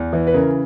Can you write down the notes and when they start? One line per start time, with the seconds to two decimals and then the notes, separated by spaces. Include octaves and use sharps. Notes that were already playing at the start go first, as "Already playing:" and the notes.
Already playing: E2
0.13 E3
0.27 B4
0.34 C#3 A#4